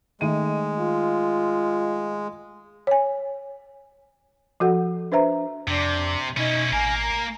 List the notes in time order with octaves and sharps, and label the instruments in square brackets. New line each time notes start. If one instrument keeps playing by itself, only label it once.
[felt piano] D#3 A3 D#7 [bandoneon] G#3
[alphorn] F4
[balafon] C#5 G#5
F3 F#4 A4 F#5
D4 B4 C5 E5 A#5
[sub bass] F2 [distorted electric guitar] C3 [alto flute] D4
[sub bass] B2 [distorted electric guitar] C#4 E4 [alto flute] D#4
[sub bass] A1 [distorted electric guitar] A#3 A#4 [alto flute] G#5
[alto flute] A#5